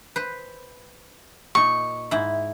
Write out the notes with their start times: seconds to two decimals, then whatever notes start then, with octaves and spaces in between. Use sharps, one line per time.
0.16 B4 C5
1.55 A#2 D#4 C#6
2.11 G#2 E4